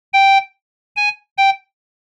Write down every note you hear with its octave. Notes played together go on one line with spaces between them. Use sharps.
G5
G#5
G5